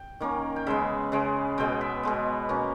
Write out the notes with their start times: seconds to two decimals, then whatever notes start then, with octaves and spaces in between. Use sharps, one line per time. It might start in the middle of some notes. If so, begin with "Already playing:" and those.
Already playing: G5
0.20 D#3 A#3 C#4
0.56 G5
0.66 C#3 G#3 B3 E5
1.12 C#3 G#3 B3
1.58 B2 G#3 B3 G5
1.81 E5
2.03 B2 G#3 B3
2.49 B2 A#3 C#4